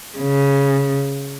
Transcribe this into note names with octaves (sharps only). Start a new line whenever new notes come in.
C#3